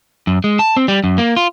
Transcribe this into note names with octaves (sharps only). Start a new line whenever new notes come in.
F#2
G#3
A5
C4
G3
F#2
A#3
F4